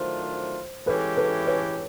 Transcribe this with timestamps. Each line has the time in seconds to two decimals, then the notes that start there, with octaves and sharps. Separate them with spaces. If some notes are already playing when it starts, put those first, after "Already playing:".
Already playing: D#3 F#3 A3 D4 F4 C5
0.86 E3 G#3 C#4 E4 G4 A4 B4
1.17 A4 B4
1.47 B4 C#5